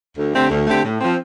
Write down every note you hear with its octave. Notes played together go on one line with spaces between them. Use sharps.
D2
D3 A3 C4 G4
D2
D3 A3 C4 G4
A2
F3 C4